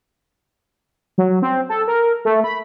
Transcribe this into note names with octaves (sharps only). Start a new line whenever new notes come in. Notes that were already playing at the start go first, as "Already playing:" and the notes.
F#3
C4
A4
A#4
A3
B5